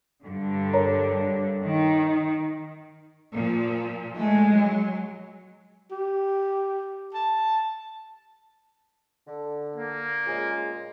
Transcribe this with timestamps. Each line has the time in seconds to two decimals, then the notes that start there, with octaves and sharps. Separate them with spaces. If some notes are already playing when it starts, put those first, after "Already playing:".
0.23 G2 D3
0.73 A#4 C#5 A#5
1.62 D#3
3.33 A#2 F3
4.18 G#3 A3
4.52 F#3
5.91 G4
7.14 A5
9.27 D3
9.76 A#3
10.26 A#2 C#3 G#3